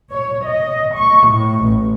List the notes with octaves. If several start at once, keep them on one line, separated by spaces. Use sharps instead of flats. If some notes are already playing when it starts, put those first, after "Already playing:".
C#5
D#5
C#6
A2
A1